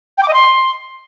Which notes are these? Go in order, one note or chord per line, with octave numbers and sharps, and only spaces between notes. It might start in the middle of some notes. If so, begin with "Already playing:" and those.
G5
D6
D#5
C6